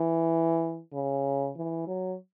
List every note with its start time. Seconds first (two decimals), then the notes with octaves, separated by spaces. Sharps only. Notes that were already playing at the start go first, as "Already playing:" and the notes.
Already playing: E3
0.93 C#3
1.56 E3
1.87 F#3